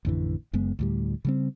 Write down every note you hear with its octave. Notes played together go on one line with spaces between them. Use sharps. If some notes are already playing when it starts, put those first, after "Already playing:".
A1 F2 D3 E3
F#1 F#2 G#3 B3
D2 A2 G3
C#3 G3 C4